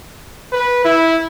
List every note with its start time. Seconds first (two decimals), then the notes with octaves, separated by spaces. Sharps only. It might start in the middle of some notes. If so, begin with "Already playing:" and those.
0.52 B4
0.85 E4